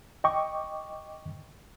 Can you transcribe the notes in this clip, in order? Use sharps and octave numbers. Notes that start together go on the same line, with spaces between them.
D#5 G5 C#6 D6